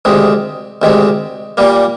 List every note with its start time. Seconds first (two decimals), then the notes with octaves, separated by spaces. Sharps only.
0.05 D2 C3 D#3 G#3
0.82 D2 C3 D#3 G#3
1.57 A#2 G3 A#3